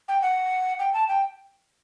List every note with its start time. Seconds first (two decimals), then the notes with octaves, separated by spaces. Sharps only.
0.08 G5
0.22 F#5
0.79 G5
0.94 A5
1.08 G5